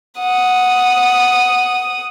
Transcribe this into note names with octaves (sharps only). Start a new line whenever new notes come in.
F#5 D#6